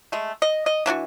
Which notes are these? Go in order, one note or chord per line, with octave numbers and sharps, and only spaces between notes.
G#3 A3
D#5
D#5
E3 D4 E4 F#4